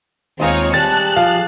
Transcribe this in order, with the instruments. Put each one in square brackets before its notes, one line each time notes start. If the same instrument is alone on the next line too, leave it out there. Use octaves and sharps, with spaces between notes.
[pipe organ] D#2 G#3 [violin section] C4 D#4 C#5 [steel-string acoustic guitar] F4 G#4 F5
[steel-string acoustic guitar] G3 [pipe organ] G4 G#4 [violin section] A5 F#6 [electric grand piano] A6
[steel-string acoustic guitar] F3 [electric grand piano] F5